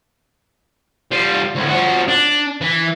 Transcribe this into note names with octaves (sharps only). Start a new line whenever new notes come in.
G3 F4
D2 A2
F3 F#4
D4
E3